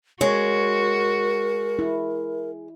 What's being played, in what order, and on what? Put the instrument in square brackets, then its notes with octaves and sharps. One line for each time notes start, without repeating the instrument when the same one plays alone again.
[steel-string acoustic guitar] G#3 [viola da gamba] F#4 [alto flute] A#4 [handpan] C#5
[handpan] E4